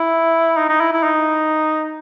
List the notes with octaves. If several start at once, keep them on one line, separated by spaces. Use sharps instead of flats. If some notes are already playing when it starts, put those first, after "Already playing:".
Already playing: E4
D#4
D#4
E4
E4
D#4